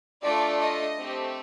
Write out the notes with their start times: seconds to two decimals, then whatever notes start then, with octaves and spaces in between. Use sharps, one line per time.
0.23 A3 D4 F4 A4 D5
0.60 D#5
0.98 A3 C4 G4